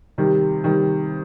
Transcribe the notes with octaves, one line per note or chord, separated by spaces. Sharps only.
C3 D#3 G3
C3 D#3 G3